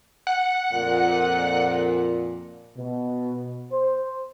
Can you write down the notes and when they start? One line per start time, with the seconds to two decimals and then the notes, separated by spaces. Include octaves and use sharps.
0.27 F#5
0.72 F2 A#2
2.77 B2
3.72 C5